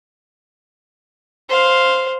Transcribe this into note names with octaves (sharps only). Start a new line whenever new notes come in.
C5 F5